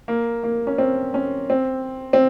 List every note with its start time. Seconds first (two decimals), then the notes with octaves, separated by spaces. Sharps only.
0.08 A#3
0.43 A#3
0.67 C#4
0.78 C4
1.14 C#4
1.50 C4
2.13 C4